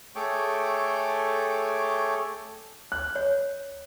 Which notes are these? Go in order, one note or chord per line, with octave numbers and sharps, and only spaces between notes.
A3 G#4 A4 C#5 G5 D6
F#6
C#5